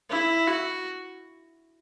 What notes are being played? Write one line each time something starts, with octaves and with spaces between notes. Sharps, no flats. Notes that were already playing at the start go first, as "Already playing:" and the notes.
E4
F#4